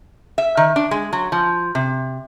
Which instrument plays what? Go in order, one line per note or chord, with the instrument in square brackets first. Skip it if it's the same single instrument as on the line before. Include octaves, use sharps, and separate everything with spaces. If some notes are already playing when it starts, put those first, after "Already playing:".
[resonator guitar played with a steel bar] E5
D#3
D4
G#3
F#3
F3
C3